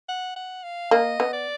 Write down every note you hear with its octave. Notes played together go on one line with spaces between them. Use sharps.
F#5
F#5
F5
A#3 D#5
B3
D5